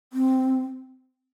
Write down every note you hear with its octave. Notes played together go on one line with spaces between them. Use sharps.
C4